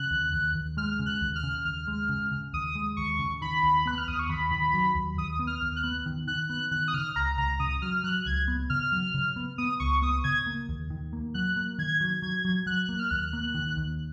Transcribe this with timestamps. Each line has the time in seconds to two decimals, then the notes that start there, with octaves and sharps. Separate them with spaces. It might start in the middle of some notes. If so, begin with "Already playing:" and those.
Already playing: C#3 F#6
0.11 D#2
0.33 D#2
0.55 D#2
0.77 G#3 F6
0.99 C#3
1.06 F#6
1.21 D#2
1.36 F6
1.43 C#3
1.65 D#2 F6
1.87 G#3
2.09 C#3
2.32 C#3
2.53 D#2 D#6
2.75 G#3
2.97 D#2 C#6
3.19 C#3
3.41 D#3 B5
3.63 D#2
3.86 B3 F#6
3.98 F6
4.08 D#2 D#6
4.19 C#6
4.30 D#2 B5
4.51 D#3
4.74 F#3
4.95 D#2
5.17 D#2 D#6
5.39 B3
5.47 F6
5.61 D#2
5.76 F#6
5.84 B3
6.06 D#3
6.27 D#3 F#6
6.50 B3 F#6
6.71 D#3 F#6
6.88 D#6
6.94 C#3 F6
7.16 C#2 A#5
7.38 C#2 A#5
7.60 C#3 D#6
7.82 F#3 F6
8.04 F#3 F#6
8.26 C#2 G#6
8.48 B3
8.70 C#3 F6
8.92 F#3
9.14 C#3
9.36 B3
9.58 B3 D#6
9.80 C#2 C#6
10.02 B3 D#6
10.24 C#3 G#6
10.46 A#3
10.69 D#2
10.90 D#3
11.13 A#3
11.34 F#3 F#6
11.56 A#3
11.78 D#3 G#6
12.01 F#3
12.22 F#3 G#6
12.45 F#3
12.66 F#3 F#6
12.89 A#3
12.99 F6
13.11 D#2 F#6
13.33 A#3
13.55 D#3
13.77 D#2